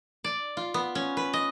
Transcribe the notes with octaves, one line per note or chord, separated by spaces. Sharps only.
D5
F4
B3
C#4
B4
D#5